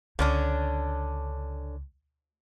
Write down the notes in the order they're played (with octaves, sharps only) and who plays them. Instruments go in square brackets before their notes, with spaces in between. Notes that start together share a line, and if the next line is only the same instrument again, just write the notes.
[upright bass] C#2 [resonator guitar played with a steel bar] D3 C#4 D4